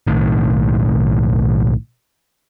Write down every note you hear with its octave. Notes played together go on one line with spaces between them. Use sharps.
B1 A2 D#3